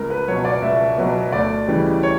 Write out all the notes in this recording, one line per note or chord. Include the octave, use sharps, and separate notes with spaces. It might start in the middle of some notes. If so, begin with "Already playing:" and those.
Already playing: C#2 A#4
B4
B2 F#3 C#5
D5
C#2 E5
B2 F#3
D2 D5
C#3 E3 G3
C#5